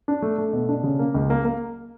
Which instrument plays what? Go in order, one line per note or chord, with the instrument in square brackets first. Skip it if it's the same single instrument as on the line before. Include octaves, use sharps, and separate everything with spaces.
[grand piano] D4
A3
A3
B2
D4
C#3
A#3
C#2
A#3
A#3